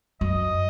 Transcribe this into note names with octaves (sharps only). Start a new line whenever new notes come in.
F#2 D#5